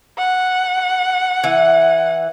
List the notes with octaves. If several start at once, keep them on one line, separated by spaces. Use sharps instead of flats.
F#5
E3